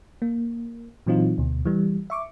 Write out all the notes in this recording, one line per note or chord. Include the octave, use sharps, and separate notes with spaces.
A#3
A#2 E3 F#3 C4 D#4 F4
D2 B2
E3 G3
E5 C#6 D6